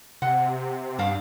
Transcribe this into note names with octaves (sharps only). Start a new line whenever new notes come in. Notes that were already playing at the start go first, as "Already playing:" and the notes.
C3 F#5
G2 D4 F5